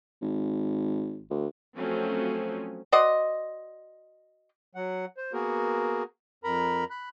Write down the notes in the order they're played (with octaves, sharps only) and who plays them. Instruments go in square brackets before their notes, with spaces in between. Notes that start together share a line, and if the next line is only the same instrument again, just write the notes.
[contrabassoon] G#1
D2
[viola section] F3 F#3 A3 C4 C#4
[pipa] F#4 C5 D5 D#5
[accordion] F#3 F#5
C5
A#3 B3 F#4 G#4 A#4
F2 A#4 A#5 B5
B5 F#6